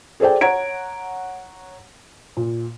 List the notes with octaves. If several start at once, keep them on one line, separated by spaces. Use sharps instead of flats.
G#4 A4 C5 D5 G5
C#5 F#5 A#5 G#6 D7
A#2